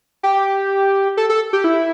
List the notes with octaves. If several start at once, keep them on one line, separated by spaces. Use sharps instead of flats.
G4
A4
A4
G4
E4